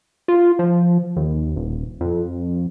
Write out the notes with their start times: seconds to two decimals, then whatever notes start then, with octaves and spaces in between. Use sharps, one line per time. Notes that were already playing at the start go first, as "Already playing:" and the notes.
0.28 F4
0.59 F3
1.16 D#2
1.56 D#1
2.01 F2